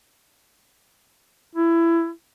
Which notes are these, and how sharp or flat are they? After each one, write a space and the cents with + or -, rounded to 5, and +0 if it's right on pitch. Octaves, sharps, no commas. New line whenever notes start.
E4 +20